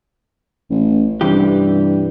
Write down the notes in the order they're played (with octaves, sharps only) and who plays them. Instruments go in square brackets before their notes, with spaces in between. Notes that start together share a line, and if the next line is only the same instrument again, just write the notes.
[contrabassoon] A1
[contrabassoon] G2 [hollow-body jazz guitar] C3 E3 G4